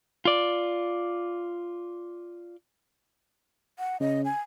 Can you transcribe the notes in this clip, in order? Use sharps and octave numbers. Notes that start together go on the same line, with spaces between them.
F4 D5
F#5
C#3 D#5
G#5